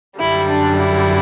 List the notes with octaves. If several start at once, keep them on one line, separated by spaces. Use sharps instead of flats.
F#2 D3 G3 E4
D4
E4